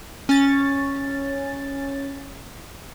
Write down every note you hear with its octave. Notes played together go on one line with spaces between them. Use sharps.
C#4 A6